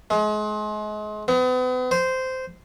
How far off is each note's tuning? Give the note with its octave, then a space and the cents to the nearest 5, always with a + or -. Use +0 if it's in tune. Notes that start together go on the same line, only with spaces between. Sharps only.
G#3 +35
B3 +40
C5 -15